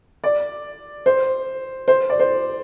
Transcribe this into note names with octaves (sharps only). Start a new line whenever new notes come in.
D5
C5
C5
D5
C5